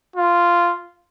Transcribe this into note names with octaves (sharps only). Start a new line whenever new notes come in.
F4